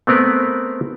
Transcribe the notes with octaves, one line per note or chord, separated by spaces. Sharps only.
A3 B3 C4 A#4 B4